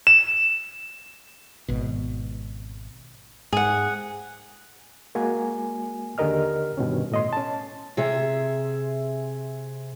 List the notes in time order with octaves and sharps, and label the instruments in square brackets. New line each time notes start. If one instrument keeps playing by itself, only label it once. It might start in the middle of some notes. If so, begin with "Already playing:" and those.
[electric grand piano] E7
[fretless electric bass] G#1 B2
[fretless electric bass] G#2 [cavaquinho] G#4 F#5
[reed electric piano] G#3 A#3 F#4 G#5
D#2 D3 G4 A#4 D#5 F6
G2 B2 D#3 C#4
A2 D#5 C6
C#4 A5
[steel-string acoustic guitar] C3 G#4 E5